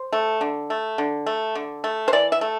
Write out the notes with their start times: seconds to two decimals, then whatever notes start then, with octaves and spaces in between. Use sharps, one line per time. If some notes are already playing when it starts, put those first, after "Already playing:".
Already playing: C5
0.13 A3
0.41 D3
0.70 A3
0.98 D3
1.26 A3
1.55 D3
1.84 A3
2.08 C5
2.13 E3 D5
2.32 E5
2.41 A3